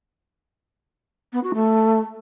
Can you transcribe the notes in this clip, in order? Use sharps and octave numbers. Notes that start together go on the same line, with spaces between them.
B3
F#4
A3